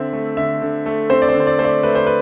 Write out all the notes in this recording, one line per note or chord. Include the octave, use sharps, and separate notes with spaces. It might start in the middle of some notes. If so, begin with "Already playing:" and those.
Already playing: D3 C4 E5
A3
D3 E5
D3
A3
C4 C5
D5
C5
D3
C5
D5
A3 C5
D5
A3 B4
C5
B4